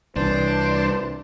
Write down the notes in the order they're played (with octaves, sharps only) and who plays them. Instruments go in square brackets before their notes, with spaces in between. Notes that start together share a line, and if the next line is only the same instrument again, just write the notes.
[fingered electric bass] C2 E3 [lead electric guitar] D4 [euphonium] B4 [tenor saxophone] C5